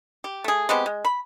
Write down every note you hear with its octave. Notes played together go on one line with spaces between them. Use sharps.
G4
A3 G#4
G#3 B3 C4 G4
G#3
B5